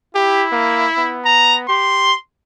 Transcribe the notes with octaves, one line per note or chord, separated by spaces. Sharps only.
E4 G4
A#3
B3
A#5
G4 C6